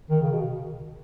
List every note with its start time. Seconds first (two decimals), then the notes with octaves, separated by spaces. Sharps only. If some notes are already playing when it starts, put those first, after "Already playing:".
0.10 D#3
0.22 C#3
0.33 B2